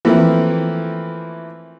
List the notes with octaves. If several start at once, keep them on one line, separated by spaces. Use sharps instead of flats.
E3 F3 A3 A#3 C4 E4